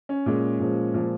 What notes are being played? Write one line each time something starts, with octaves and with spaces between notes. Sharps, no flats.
C#4
A#2 G#3
A#2 F3 G#3
A#2 F3 G#3